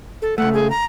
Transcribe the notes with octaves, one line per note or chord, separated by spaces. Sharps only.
A4
C#2 A3 F#5
G#4
A#5